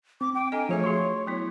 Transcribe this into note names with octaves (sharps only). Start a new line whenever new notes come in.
C4 D6
G5
D4 A4 D#5 G#5
F3 A3 G#4 C#5 E5
F#4 G#4 C6 C#6
F#3 B3 E4